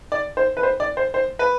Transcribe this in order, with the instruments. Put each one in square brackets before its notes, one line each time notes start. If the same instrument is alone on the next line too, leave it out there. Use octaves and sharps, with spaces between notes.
[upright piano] D5
C5
B4
C5
D5
C5
C5
B4